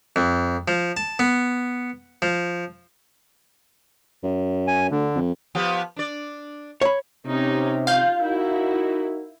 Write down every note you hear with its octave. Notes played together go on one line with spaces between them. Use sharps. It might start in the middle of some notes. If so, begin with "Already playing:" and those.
F2
F3
A5
B3
F3
F#2
G#5
D2 D3
F2
F3 B3 G4
D4 D5
C#5 B5
C3 C#4 D#4 G4
F4 F5 G6
D#4 E4 F#4 A#4